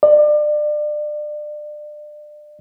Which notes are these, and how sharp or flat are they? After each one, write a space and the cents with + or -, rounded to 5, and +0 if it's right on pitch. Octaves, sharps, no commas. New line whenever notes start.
D5 +30